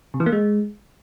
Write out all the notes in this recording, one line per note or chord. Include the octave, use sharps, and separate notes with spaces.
C3
E3
A#3
G#3